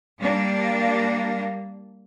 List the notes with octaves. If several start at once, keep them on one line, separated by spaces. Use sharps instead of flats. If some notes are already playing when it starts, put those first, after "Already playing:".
G3 A#3 D4